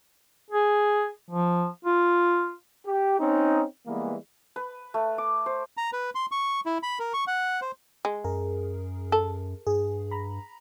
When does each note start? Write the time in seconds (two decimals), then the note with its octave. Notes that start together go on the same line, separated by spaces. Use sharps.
0.51 G#4
1.31 F3
1.85 F4
2.86 G4
3.20 C4 C#4 D#4
3.87 E3 G3 G#3 A#3 B3
4.56 B4
4.94 A3
5.18 D6
5.46 C5
5.77 A#5
5.93 B4
6.15 C6
6.31 C#6
6.66 E4
6.83 B5
6.99 A#4
7.14 C#6
7.27 F#5
7.61 C5
8.05 G#3
8.24 F#2 G#4 A#4
9.12 A4
9.67 G2 G#4
10.11 A#5 B5